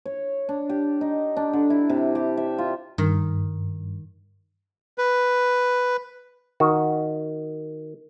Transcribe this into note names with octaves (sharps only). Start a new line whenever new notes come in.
C#5
D4
G4
D#4
D4
D3
E4
C3
G4
E5
F4
G2 D#3
B4
D#3 F#4